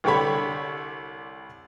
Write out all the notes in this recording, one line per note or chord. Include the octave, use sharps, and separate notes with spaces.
C2 D3 G4 A4 C#5 B5